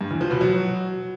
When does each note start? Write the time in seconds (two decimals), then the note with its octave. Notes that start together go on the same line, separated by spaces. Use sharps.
0.01 G2
0.11 E2
0.21 F3
0.31 B2
0.41 F#3